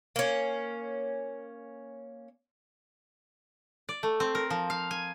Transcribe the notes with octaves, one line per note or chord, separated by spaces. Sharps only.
A#3 C#4
D5
A3
C4
A#4
F3
F5
G#5